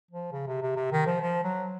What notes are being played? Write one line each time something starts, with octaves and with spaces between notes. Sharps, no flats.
F3
C#3
C3
C3
C3
D#3
F3
F3
F#3